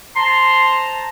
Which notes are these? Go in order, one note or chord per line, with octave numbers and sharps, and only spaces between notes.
C5 A5 A#5 C6